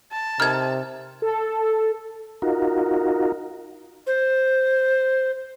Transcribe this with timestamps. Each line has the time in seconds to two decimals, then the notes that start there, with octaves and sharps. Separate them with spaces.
0.12 A5
0.40 C3 D#4 A4 A#4 F6 G#6
1.22 A4
2.42 D#4 F4 F#4 A#4
4.07 C5